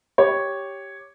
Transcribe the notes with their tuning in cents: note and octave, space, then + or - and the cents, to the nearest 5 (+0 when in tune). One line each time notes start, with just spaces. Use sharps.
G4 +0 C#5 +0